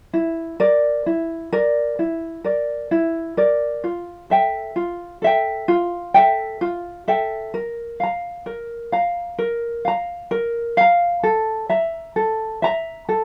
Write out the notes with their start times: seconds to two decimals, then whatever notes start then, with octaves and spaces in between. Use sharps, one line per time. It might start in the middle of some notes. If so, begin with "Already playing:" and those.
0.13 E4
0.60 A#4 D5
1.06 E4
1.53 A#4 D5
1.99 E4
2.44 A#4 D5
2.91 E4
3.37 A#4 D5
3.84 F4
4.30 A4 E5 G5
4.76 F4
5.22 A4 E5 G5
5.68 F4
6.14 A4 E5 G5
6.61 F4
7.08 A4 E5 G5
7.54 A#4
8.00 F5 A#5
8.46 A#4
8.92 F5 A#5
9.39 A#4
9.85 F5 A#5
10.31 A#4
10.77 F5 A#5
11.23 A4
11.69 E5 A#5
12.16 A4
12.62 E5 A#5
13.09 A4